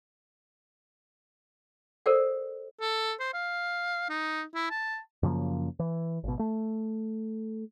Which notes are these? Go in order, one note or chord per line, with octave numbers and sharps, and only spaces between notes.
A4 A#4 C5 D5 F#5
A4
C5
F5
D#4
E4
A5
F#2 C#3 F3 A#3
E3
G#1 B2
A3